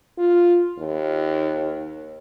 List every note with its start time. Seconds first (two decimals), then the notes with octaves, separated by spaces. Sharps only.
0.18 F4
0.78 D#2